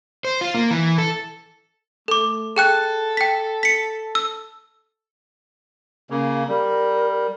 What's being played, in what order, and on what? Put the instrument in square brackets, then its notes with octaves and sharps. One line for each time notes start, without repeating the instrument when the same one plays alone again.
[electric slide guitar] C5
F4
A#3
E3
A4
[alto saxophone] A3 [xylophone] A4 D6
[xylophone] G#4 G5 F#6 [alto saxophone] A4
[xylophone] G5 B6
B6 C#7
E6
[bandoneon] C#3 A#3
[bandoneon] G3 [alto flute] A#4